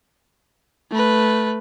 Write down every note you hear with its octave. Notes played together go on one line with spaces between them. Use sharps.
A3 B4